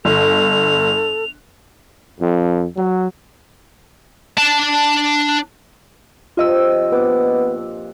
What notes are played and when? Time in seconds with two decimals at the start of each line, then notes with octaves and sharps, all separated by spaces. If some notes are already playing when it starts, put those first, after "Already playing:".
0.05 G1 A4 F7
2.19 F2
2.76 F#3
4.38 D4 A5
6.37 G2 C3 F3 F4 D#5 E6
6.92 A#2 B3 D4 D6